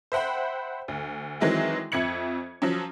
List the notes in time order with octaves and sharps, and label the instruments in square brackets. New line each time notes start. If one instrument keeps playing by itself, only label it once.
[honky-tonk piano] C5 E5 F#5 G5 B5
D2
D#3 E3 F#3 G#3 C4 E4
F2 E5 G#6 C#7 F#7
F3 F#3 C#4